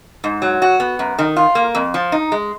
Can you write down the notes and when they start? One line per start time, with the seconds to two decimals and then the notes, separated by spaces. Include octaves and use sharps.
0.24 G#2
0.42 F#3
0.62 F#4
0.80 B3
0.99 F#2
1.19 D#3
1.36 F4
1.55 A#3
1.75 F2
1.94 F3
2.12 D#4
2.32 G#3